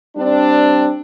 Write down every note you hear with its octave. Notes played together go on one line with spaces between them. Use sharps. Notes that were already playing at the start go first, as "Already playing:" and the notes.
G3 C4 D4